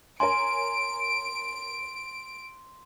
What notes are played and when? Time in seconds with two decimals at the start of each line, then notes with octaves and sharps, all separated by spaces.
0.20 A#4 C#5 G#5 C6 D7